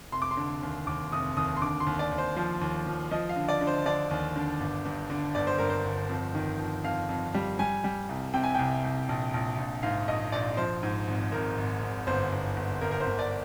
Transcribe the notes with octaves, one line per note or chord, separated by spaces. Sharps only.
F1 C6
D6
C6
D3
D#2
D#2 D6
F1 D#6
D#2 D#6
C6
D3 D6
C6
D#2
D5
D#2
C5
F3 C5
D#2
F3
F3 D#5
F5
D3
D5
D3
C5
D3 D5
D#2
D3
G1
G2
D3
G1 D5
C5
G2 A#4
C5
G1
F2
D#3
F2
F2 F5
F2
G3
G3 G#5
G3
C2
C3 G5
G#5
C2 G5
C2
A#1
A#1
A#1
G#2 F5
A#1 D#5
A#1 D5
F3 C5
G#2
G#1
G#1 A#4
G#1
G#1
G1 C5
G1
G1
G1 A#4
A#4
C5
G1
D5